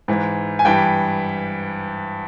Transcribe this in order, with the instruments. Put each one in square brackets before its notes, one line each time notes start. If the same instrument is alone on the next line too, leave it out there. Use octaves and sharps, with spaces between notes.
[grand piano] G#2 E3
G#5
G2 E3 G5